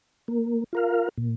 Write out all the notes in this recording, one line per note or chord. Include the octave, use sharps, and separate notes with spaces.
A#3
F4 A#4 F5
A#2